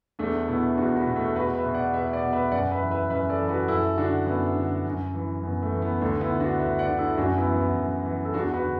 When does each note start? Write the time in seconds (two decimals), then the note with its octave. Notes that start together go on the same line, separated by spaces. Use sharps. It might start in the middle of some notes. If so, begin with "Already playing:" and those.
0.19 E2 A3 D4
0.48 B2 B3 E4
0.77 E2 D4 F#4
0.96 F#4 B4
1.06 B2
1.16 A3
1.35 E2 F#4 B4
1.55 B4 E5
1.65 B2
1.74 D5 F#5
1.93 E2 B4 E5
2.13 D5 F#5
2.23 B2
2.32 B4 E5
2.52 F#2 D5 F#5
2.72 B4 E5
2.81 E3
2.91 B4 E5
3.10 F#2 B4 E5
3.29 A4 D5
3.39 E3
3.49 F#4 B4
3.68 F#2 E4 A4
3.97 D3 D4 F#4
4.26 F#2 B3 E4
4.55 D3
4.85 F#2
5.14 E3
5.43 F#2 B3
5.63 A3
5.72 E3
5.82 B3
6.01 D2 A3 D4
6.21 B3 E4
6.30 D3
6.40 D4 F#4
6.59 D2 B4 E5
6.79 D5 F#5
6.89 D3
6.99 E4 A4
7.18 F#2 D4 F#4
7.37 B3 E4
7.47 E3
7.57 B3 E4
7.76 F#2
8.05 E3
8.25 A4
8.34 E2 D4 F#4
8.54 F#4 B4
8.64 D3